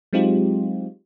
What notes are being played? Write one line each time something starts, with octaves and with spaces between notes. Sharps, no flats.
F#3 G#3 C4 D#4 F4 G4